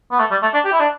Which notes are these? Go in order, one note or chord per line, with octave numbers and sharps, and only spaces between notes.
B3
A3
G3
A3
D4
G4
E4
D4